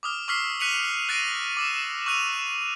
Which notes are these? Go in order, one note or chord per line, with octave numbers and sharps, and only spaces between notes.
D6 D#6 F6
C#6 D6 E6 F6 B6 C7
F#6 B6 C#7 D#7 F7 F#7
F#6 A6 A#6 C7 D7 D#7
D6 E6 E7
C#6 E6 F#6 D#7 F7